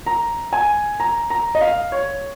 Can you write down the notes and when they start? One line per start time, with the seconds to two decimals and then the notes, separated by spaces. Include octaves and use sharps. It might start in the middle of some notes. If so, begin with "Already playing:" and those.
0.06 A#5
0.53 G#5
1.00 A#5
1.30 A#5
1.55 D#5
1.61 F5
1.92 C#5